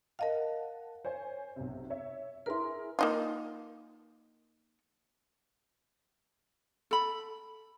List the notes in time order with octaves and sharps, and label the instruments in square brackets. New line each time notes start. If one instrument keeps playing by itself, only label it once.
[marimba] A#4 D#5 F5 [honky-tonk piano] F#5 A5
[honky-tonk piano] C5 C#5 G#5
B1 C3
C#5 E5
[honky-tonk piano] E4 G#4 A#4 [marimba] B4 C6
[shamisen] A#3 D#4 F4
[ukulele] A4 B5